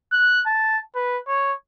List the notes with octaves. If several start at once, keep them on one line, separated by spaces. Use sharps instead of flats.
F#6
A5
B4
C#5